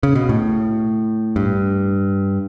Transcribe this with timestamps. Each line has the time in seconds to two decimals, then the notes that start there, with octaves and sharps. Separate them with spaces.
0.03 C#3
0.15 B2
0.29 A2
1.36 G2